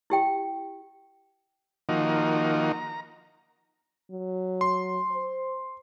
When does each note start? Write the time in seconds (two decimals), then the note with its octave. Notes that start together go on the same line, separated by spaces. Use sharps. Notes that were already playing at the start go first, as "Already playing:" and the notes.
0.10 E4 G4 G5
1.89 D#3 F3 A#3 D#4 F#4
2.73 A#5
4.11 F#3
4.61 C6
5.12 C5